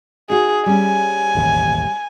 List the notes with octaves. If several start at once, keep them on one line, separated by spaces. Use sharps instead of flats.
D#4 F#4 G#4
G3 C#4 G#5
E1 A1 D#2